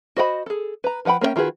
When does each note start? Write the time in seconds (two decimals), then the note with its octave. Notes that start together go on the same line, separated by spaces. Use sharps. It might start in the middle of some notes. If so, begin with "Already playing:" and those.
0.16 F#4 C5 D#5 F#5 B5
0.46 G#4 A4
0.84 B4 A#5
1.05 F3 B4 F#5 G5 B5
1.21 A#3 C#4 B4 E5 G5
1.36 D#3 F4 F#4 G#4 B4